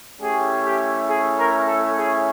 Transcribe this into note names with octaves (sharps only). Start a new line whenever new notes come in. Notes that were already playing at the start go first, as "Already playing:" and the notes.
A3 C#4 E4 G4 G#4
G4
G#4
A#4
A4
G#4